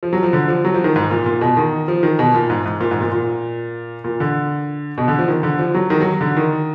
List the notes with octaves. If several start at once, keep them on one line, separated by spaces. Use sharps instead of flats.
F3
F#3
F3
D3
F3
F#3
F3
D#3
G#2
A#2
A#2
B2
D#3
F3
D#3
B2
A#2
G#2
G#2
A#2
G#2
A#2
A#2
A#2
D3
B2
D3
F3
D#3
D3
F3
F#3
D#3
F#3
D3
D#3